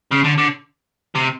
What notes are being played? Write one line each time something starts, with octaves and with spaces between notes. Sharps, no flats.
C#3
D3
D3
C3